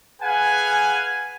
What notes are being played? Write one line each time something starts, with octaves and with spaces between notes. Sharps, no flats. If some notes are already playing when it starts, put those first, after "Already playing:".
G#4 B4 F5 F#5 G#5